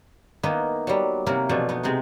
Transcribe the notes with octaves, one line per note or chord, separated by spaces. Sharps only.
D#3 A#3 B3 E4 D#5
F#3 G3
C3 F#3 A#3 E4 A#4
B2 E3 F3 A3 D4
B3 D#4
C3 G#3 C4 D#4